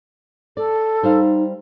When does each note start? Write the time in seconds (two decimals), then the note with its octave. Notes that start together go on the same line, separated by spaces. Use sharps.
0.57 A4 D5
1.03 G3 D#4 C5 F5